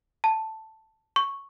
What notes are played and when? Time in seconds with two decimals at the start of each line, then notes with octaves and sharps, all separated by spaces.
0.24 A5
1.16 C#6